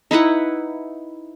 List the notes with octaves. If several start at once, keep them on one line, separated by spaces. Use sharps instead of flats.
D#4 E4 B4 F#5